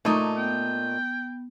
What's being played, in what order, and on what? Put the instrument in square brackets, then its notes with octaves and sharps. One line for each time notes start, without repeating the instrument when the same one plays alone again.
[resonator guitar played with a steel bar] A#2 D#4 [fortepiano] A3 [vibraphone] A5 A#5 C#6
[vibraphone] B3 [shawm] G5